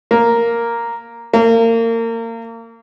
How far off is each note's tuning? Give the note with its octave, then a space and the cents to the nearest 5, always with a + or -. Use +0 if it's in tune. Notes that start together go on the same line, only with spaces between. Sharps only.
A#3 +0
A#3 -30